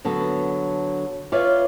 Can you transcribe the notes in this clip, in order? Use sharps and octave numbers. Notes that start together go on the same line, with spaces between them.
D3 F#3 B3 A4
F4 B4 C#5 D5 E5 F5